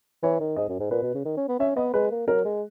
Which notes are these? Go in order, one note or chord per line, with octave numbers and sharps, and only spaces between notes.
E3 C#5
D#3
G#2 D#5
F#2
G#2
A#2 B4
B2
C#3
D#3
C#4
B3
C#4 E5
B3 D#5
G#3 B4
A#3
F#3 A#4
G#3